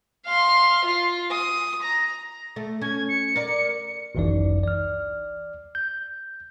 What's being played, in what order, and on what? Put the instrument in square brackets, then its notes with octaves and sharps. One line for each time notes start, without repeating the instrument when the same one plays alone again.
[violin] F5 C6
F4
D#6
A#5
[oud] A3
[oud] C#4 [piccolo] G#6
[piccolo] C#7
[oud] A#4 D5
[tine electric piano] G#1 C#2 F#2 E3 D#4 D5
D5 F6
G6